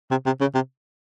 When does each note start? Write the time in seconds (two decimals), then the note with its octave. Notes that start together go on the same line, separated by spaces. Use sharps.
0.11 C3
0.26 C3
0.40 C#3
0.54 C3